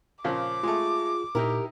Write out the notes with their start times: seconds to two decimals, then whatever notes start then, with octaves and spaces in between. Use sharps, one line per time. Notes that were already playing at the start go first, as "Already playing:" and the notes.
0.24 A#2 C#3 F3 D6
0.63 G#3 A3 F4 G#4
1.35 A#2 D#4 E4 G4 A#4